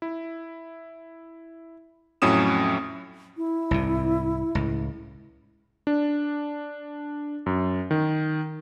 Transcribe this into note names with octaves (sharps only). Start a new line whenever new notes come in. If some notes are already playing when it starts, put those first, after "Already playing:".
E4
F2 A2 F#3 C#4 D#6 E7
E4
C2 G#2 C3
C#2 A2
D4
F#2
D#3